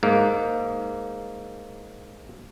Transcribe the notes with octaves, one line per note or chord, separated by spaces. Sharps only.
G#2 A#3